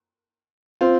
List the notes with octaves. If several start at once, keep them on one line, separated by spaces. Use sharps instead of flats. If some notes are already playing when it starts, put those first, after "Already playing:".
C4 F4